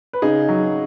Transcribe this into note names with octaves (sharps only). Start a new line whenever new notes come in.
B4
C#3 D#4 G#4
F#3